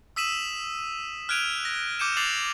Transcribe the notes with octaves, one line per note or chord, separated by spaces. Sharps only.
D#6 E6 B6 D#7 E7 F#7
F6 F#6 G#6 D7 D#7 F7
A#6
D6 G6 C#7 D#7 E7
D6 A6 C7 F7 F#7